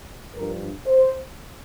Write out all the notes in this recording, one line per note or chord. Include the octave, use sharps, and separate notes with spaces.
G2 F3 D4 A#4
C5